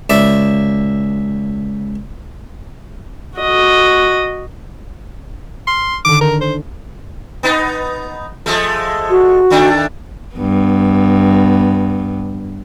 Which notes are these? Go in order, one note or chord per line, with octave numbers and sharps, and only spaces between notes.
C#2 D5 E5
F#4 D#5
C6 F6
D3 D#3 D6
A#4
C5
B3 D#4
F3 G#3 A3
F#4
D#3 A3 D4
G2 B3